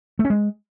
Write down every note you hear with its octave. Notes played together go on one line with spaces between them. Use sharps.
A3
C#4
G#3